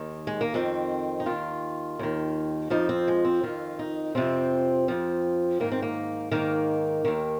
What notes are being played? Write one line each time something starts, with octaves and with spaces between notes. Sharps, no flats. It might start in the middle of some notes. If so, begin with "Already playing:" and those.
Already playing: D#2 D#3
G#3
A#3
F2 D#3 C4
D#4
D#2 D#3 F4
D#2 D#3
F2 F3 D#4
C4
G#3
C4
F2 D#3 F4
D#4
F2 C3 F3 C4
F2 F3
G#2 D#3 A#3
C4
A#3
G#2 D#3 A#3
D#2 D#3